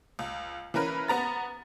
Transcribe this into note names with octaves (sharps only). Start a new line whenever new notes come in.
C#2
E3 C#4 A#4 B4
B3 A#5 A6